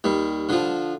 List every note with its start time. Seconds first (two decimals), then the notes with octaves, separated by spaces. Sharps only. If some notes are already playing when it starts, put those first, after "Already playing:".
0.04 D#2 G3
0.49 D3 F3